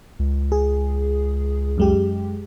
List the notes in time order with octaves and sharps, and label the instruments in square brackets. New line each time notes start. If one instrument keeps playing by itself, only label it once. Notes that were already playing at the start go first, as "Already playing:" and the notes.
[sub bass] C#2
[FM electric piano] G#4
F#2 G#3 G4